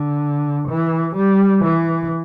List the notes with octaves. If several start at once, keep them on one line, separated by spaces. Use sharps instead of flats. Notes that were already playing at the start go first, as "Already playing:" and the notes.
Already playing: D3
E3
G3
E3